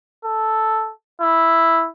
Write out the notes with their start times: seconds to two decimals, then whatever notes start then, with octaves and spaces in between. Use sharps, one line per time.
0.25 A4
1.21 E4